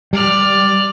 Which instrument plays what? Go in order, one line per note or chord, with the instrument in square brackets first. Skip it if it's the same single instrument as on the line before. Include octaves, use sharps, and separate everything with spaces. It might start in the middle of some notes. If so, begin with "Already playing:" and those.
[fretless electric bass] G3 [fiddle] D5 F6